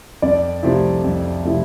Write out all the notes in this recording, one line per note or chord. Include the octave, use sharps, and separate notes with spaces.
F2 D5
C3 F3 A3 E4
F2
C3 F3 A3 E4